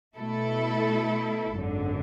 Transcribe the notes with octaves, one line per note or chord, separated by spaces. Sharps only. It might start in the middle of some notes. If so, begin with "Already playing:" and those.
B2 A3 E4 A4
G#1 F#2 D3